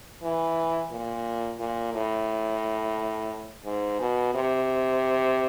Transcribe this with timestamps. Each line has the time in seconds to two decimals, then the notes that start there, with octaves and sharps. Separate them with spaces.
0.23 E3
0.92 A#2
1.59 A#2
1.93 A2
3.65 G#2
4.00 B2
4.35 C3